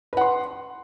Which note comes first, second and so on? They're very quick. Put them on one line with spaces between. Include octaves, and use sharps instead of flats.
B4 F#5 C6